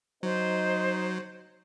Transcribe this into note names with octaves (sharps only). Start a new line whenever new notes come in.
F#3 D#4 C5